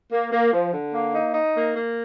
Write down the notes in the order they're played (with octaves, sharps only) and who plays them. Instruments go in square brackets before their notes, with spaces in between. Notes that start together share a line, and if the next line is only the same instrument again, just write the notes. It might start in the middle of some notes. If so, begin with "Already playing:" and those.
[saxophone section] A#3
A#3
F3
D3
A#3
D#4
D#4
A#3
A#3